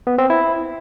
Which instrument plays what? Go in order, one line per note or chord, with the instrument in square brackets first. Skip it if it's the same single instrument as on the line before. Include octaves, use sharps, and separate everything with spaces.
[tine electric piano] B3
C4
E4